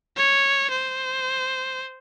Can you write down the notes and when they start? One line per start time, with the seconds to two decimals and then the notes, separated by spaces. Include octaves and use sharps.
0.17 C#5
0.71 C5